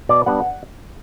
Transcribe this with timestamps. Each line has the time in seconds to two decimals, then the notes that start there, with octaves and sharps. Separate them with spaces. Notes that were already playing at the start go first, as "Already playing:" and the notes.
0.09 B2 D5
0.26 G3 B3 D4 F#5